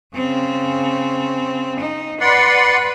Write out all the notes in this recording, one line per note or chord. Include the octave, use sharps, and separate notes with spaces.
C#3 C4
D#4
B4 D5 F#5 C6